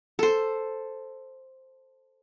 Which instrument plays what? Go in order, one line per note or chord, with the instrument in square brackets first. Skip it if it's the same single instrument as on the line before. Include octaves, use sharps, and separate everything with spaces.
[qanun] A4 C5